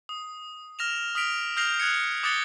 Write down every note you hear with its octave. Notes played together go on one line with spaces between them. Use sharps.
D#6
F6 A#6 E7 F7
D#6 F6 B6 D7 F7
D#6 F6 G6 A#6 C7 F7
D#6 F#6 G#6 C#7
D6 D#6 F#6 A6 C#7 G7